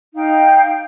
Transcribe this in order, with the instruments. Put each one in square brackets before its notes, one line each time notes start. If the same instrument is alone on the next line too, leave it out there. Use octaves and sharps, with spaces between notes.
[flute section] D#4 F5 G5